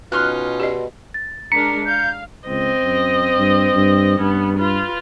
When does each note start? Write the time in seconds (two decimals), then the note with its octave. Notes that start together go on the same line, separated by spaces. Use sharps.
0.12 B2 C#4 D#4 F4 C6 F6 F#6
0.60 G4 D5 D#5
1.14 A6
1.52 G#3 D4 A#4 A#5 B6 C#7
1.86 F5 G6
2.48 C#2 C4 D#5
2.82 F#2
3.37 G2
3.74 G2
4.20 G2 B3 C#4
4.57 F4 B4